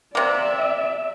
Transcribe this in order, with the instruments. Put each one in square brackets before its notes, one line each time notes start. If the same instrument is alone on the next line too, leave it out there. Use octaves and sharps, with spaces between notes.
[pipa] C3 A#3 [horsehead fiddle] D5 E5